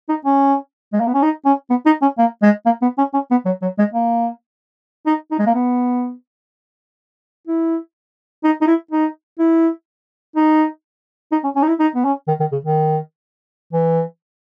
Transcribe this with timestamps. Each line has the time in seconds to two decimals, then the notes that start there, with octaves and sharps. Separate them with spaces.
0.09 D#4
0.25 C#4
0.93 G#3
1.00 A#3
1.07 B3
1.14 C#4
1.22 D#4
1.45 C#4
1.70 B3
1.86 D#4
2.02 C#4
2.18 A#3
2.43 G#3
2.66 A#3
2.82 B3
2.98 C#4
3.14 C#4
3.31 B3
3.46 F#3
3.62 F#3
3.79 G#3
3.94 A#3
5.06 D#4
5.31 D#4
5.39 G#3
5.47 A#3
5.55 B3
7.47 E4
8.44 D#4
8.62 D#4
8.67 E4
8.91 D#4
9.39 E4
10.36 D#4
11.32 D#4
11.44 C#4
11.56 C#4
11.63 D#4
11.68 E4
11.80 D#4
11.95 B3
12.05 C#4
12.28 D#3
12.40 D#3
12.52 C#3
12.65 D#3
13.73 E3